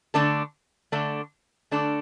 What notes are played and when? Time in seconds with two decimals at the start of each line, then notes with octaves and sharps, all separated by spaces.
0.14 D3 A3 D4 A4
0.92 D3 A3 D4 A4
1.71 D3 A3 D4 A4